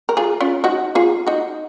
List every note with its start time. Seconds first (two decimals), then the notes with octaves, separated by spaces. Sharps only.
0.09 A#4
0.17 F4 G#4
0.41 C#4 F4
0.64 D#4 F#4
0.95 F4 G#4
1.27 D#4 F#4